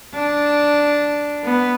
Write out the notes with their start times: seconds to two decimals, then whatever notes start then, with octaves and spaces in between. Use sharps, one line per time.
0.14 D4
1.44 B3